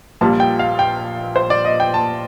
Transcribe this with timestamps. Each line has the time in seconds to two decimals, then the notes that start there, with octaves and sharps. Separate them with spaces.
0.21 A#1 A#2 G3 A5
0.40 G5
0.59 F5
0.79 G5
1.36 C5
1.50 D5
1.65 D#5
1.80 G5
1.94 A5